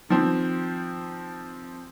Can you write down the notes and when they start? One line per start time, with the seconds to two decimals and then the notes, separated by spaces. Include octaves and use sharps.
0.09 D#3 F3 C4